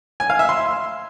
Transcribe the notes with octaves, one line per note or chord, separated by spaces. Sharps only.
G#5
F5
E5
C6